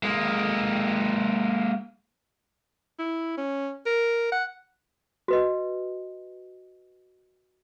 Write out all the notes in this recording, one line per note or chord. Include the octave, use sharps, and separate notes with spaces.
G#3 A#3
E4
C#4
A#4
F#5
F#4 B4 D#5